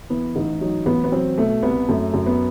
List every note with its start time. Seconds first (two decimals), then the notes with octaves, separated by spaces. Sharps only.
0.10 E3 B3
0.35 A1 D#4
0.61 F#3 D#4
0.86 A1 B3
1.04 B3
1.12 F#3 C4
1.38 B2 A3
1.62 C2 B3
1.88 F#2 A3
2.14 F#2
2.26 B3